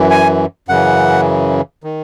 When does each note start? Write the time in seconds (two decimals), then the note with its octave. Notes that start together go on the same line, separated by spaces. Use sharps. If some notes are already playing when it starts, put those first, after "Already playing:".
Already playing: F#2 E3
0.11 G#5
0.68 F#2 C#3 E3 F#5
1.84 D#3